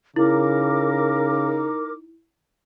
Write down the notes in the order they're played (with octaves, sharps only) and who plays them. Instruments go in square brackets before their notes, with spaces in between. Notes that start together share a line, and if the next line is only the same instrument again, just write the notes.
[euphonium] C#3 [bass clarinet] D#4 [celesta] E4 [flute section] A#4 D6